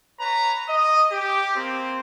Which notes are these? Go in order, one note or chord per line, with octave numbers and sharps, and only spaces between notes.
B4 C#5 A#5
D#5
G4
A#3 C4